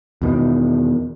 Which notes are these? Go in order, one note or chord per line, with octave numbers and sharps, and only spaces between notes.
E2 B2 D#3